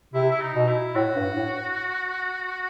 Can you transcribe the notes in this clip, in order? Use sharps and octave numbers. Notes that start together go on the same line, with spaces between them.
C3 E4
E4
D#4
B2
E4
A2 F#4
G2
A2